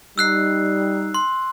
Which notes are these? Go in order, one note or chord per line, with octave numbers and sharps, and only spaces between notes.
G3 D#4 E6 F#6 C7
C6